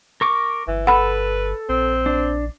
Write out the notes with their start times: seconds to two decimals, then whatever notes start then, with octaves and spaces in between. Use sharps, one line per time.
0.21 A#4 C#6 D6
0.67 G1 E3
0.87 A4 B4 F#5 B5
1.69 A#1 C4
2.06 D4